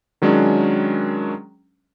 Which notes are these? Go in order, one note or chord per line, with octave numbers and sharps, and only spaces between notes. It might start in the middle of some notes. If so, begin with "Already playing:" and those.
D#3 F#3 G#3 C#4 D4